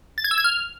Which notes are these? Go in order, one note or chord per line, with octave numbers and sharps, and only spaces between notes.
A6
G#6
E6
G#6
F6